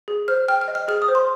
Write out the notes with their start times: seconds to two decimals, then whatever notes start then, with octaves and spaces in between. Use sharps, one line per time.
0.08 G#4
0.28 C5 F6
0.48 G5 F6
0.61 F6
0.68 D#5
0.75 F6
0.88 G#4 F6
1.02 D#6
1.08 C5
1.15 C6